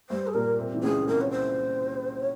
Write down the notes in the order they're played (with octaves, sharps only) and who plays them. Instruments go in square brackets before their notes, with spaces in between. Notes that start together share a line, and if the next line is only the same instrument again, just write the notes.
[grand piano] G2 G3 [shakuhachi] C5
[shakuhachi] G#4
[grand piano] A#2 A#3 [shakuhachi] A#4
[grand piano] C3 C4
E3
[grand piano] C#2 C#3 [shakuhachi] G#4
[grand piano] C2 C3 [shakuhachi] A#4
[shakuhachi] C#5
C5
C#5